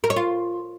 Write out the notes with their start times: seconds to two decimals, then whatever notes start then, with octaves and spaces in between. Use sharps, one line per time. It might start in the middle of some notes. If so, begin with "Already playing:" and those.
0.04 A#4
0.10 C#5
0.16 F4